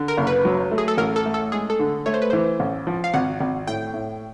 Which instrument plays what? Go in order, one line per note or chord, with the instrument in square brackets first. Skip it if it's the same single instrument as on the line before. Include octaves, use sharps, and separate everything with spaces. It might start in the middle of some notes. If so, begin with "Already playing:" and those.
Already playing: [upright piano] D3
[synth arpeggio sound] A#4
[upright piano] F#1
[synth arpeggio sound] B4
[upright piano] F#3
A3
[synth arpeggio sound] G#4
A4
[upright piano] A1 [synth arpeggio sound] A#4
[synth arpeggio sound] A4
[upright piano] A3
[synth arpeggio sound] A4
[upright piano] G#3 [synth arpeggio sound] G#4
[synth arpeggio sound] A4
[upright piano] D3
[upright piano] A3 [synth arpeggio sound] C#5
[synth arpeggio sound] C5
B4
[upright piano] E3 [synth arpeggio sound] C5
[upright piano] A1
F3
[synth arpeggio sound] F5
[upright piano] G#1 [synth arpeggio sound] F#5
[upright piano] G#1
[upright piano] A2 [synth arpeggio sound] G5
[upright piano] A2